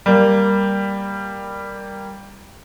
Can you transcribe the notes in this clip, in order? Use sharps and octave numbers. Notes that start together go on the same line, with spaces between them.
G3 A#3